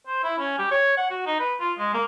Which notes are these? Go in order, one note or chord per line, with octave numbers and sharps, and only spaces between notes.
C5
E4
C#4
G4
C#5
F#5
F#4
D#4
B4
F4
G#3
A#3